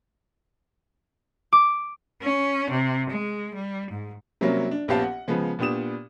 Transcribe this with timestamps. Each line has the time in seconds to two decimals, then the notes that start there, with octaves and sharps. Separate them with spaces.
1.53 D6
2.22 C#4
2.70 C3
3.11 G#3
3.54 G3
3.91 G#2
4.41 C3 F#3 G3 A#3 C#4
4.71 D4
4.88 A#1 B3 C#4 G4 F5 A5
5.02 F#5
5.28 C#3 F3 G#3 B3
5.59 A#2 B3 D4 G4 D#6 E7